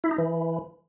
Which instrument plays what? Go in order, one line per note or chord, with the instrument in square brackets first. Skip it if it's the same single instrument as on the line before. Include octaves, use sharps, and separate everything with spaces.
[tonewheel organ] E4
D#4
E3